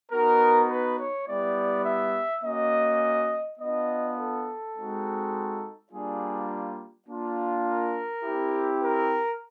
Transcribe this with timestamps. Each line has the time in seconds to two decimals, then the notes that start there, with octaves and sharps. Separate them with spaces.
0.11 B3 D#4 F#4 A#4
0.69 B4
0.98 C#5
1.27 G3 B3 E4 G4 D5
1.85 E5
2.43 A#3 C#4 F#4 D#5
3.59 B3 D4 F4 D#5
4.17 A4
4.75 G#3 C4 D#4 F#4
5.91 G3 A#3 D4 F4 G#4
7.07 A#3 D4 F4
7.66 A#4
8.24 C4 E4 G4
8.82 A#4